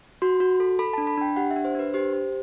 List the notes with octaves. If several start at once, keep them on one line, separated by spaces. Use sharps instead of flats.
F#4 C6
F#4
A4
A4 B5
D4 A5
B5
D4 G5
G4 F#5
E5
D4
C5
D4 B4
G4 C5
G4